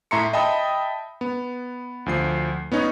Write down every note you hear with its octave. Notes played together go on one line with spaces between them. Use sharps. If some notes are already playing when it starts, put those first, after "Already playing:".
A2 E5 A#5 C6 C#7
D#5 E5 G5 A5 B5 D#6
B3
D2 F3 C7
B3 C#4 D#4 C#5